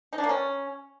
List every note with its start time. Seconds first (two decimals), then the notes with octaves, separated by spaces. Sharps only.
0.13 D#4
0.18 D4
0.24 A#3
0.29 C#4